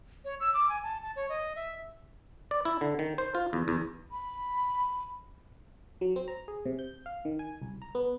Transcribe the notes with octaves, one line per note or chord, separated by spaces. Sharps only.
C#5
E6
D6
G#5
A5
A5
C#5
D#5
E5
D5
E4
D3
D#3
C5
F4
E2
E2
B5
F#3
C4
A#5
G#4
C3
G6
F5
D#3
G#5
C2
A#5
B3